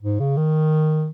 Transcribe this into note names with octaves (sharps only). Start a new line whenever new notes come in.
G#2
C#3
D#3